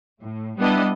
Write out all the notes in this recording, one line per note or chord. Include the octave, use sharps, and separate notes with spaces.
A2
G3 B3 D4 E4 D#5